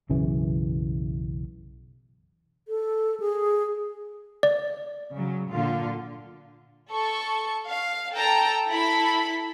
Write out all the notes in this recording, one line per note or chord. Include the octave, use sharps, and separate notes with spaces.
B1 F#2 C#3 E3
A4
G#4
D5
C#3 F#3
A#2 D3 F4
A4 C#6
F5
A4 G5 A5 A#5
E4 A4 B5